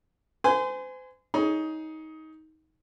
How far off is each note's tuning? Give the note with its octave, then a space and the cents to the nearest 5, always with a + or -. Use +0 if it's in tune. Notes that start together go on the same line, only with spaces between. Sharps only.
C5 -40 G#5 +0 C6 -30
D#4 +20 G#4 +10 C#5 +20